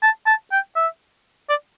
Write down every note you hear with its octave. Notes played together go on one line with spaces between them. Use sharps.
A5
A5
G5
E5
D5